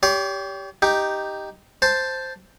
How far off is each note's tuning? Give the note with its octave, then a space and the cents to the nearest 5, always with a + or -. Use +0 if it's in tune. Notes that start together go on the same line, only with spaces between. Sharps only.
G4 +0 C#5 +45 C6 +0
D#4 +0 G4 +0
C5 +0 A5 +0